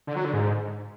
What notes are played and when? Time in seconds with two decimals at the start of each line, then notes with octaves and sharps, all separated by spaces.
0.07 D3
0.16 F#3
0.25 D3
0.33 G#2